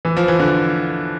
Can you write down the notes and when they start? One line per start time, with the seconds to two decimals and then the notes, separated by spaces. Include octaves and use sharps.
0.05 E3
0.17 F3
0.28 E3
0.40 D3